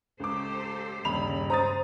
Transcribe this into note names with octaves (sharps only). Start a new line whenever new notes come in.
C#2 G4 A4 C5 D6
D#1 G2 C#3 B5 F7
C5 A#5 D#6 A6